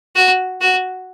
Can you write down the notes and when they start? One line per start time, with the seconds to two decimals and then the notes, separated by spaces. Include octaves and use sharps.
0.16 F#4
0.61 F#4